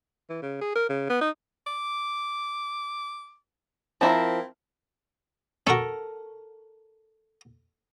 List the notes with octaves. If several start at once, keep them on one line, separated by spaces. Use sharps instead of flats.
E3
C#3
G#4
A#4
C#3
B3
D#4
D6
F3 C4 E4 A#4
C#4 F#4 A4 A#4